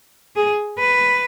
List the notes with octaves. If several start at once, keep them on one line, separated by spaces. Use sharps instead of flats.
G#4
B4